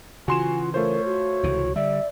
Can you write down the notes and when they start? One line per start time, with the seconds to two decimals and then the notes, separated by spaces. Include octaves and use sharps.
0.28 C#3 E3 F4 F#4 G#5 C6 E7
0.74 A3 F4 A#4 C5 C#5
1.06 F#4
1.43 C#2 C3 E3
1.76 D3 G3 D5 E5